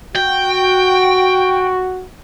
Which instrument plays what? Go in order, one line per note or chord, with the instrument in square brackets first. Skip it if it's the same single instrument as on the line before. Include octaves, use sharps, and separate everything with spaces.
[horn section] F#4 [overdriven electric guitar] G5